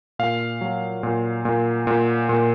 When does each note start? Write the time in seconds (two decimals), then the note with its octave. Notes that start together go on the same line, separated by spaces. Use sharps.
0.19 A#2 F5
0.61 F#3
1.03 A#2
1.45 A#2
1.87 A#2
2.29 A#2